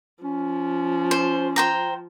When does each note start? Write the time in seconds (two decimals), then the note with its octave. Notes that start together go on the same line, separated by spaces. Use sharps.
0.23 F3 C#4
1.11 C5
1.56 C5 G5 A#5